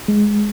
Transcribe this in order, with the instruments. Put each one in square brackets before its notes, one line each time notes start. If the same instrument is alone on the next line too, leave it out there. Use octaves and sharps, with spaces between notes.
[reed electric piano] G#3